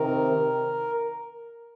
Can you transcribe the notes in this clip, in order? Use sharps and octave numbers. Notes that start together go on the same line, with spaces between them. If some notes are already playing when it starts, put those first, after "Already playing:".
Already playing: C3 D#3 A#4